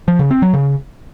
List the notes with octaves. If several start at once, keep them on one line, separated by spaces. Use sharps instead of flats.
F3
C#3
C4
F#3
C#3